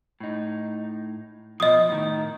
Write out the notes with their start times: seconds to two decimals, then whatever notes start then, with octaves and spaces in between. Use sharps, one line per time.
0.20 A2 D#4
1.60 B2 F3 D#5 D#6
1.89 A2 D#3